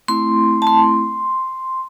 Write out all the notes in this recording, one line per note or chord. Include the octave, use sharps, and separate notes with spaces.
A3 C4 E4 C6
A5
C6